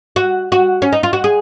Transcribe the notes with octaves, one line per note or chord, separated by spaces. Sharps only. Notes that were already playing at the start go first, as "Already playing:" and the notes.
F#4
F#4
C#4
D#4
F4
F#4
G#4